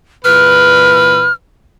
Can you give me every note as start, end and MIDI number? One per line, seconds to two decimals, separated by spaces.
0.25 1.28 46
0.25 1.28 52
0.25 1.28 71
0.25 1.33 89